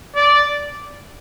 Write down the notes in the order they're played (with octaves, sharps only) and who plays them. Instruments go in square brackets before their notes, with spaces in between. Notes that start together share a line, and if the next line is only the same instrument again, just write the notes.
[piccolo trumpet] D5